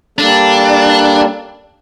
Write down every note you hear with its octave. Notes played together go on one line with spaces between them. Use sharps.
G3 A#3 D4 A4